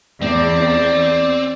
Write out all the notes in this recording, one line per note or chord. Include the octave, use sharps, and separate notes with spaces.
E2 C4 D5